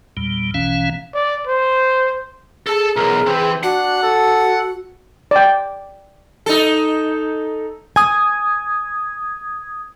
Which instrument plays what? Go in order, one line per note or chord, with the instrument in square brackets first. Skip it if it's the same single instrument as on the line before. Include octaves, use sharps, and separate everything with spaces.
[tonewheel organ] E2 A#2 G3
A#1 B2 E3 C#4 F5
[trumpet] D5
C5
[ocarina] G#4 [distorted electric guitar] A4 A5
[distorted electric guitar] B1 E2 [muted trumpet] A#4
[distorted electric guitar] E3 [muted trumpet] C4
[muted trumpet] D4 [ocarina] F#4 [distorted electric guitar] F#5
[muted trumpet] A4
[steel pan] D5 G5
[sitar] D#4 A4
[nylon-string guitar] G#5 [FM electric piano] D#6 G#6